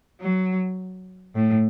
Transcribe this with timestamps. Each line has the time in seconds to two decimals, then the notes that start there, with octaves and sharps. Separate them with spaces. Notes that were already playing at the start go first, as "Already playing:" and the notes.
0.21 F#3
1.35 A2